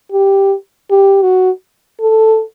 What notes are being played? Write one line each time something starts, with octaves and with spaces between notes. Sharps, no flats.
G4
G4
F#4
A4